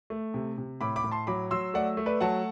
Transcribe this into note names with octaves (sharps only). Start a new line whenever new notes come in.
A3
C3
C3
A2 B5 D6
B5 D6
A2
A5 C6
F#3 B5 D6
F#3 C6 E6
A3 D5 F#5
A3
B4 D5
F#3 F#5 A5